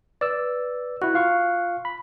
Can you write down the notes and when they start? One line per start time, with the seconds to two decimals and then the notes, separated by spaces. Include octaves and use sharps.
0.21 B4 D5 E6
1.02 E4 F#4 F#6
1.14 F4 F5 C#6
1.85 B5